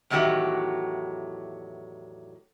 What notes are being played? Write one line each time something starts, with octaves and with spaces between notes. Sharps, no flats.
E2 A2 D#3 F#3 F#4 G4